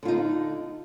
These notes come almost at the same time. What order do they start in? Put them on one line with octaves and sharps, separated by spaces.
D3 F4 D#4